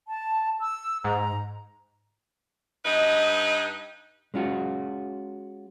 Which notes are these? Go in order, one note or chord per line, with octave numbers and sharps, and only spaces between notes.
A5
E6
G#2 A#5
G2 D#4 B4 D#5
G#3 C#4 F4 F#4